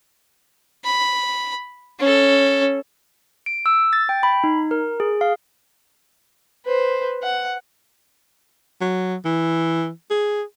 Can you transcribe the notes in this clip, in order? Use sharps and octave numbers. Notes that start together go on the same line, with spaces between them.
B5
C#4 A4
D7
E6
A6
G5
B5
D#4
A#4
G#4
F5
B4 C5
F#5
F#3
E3
G#4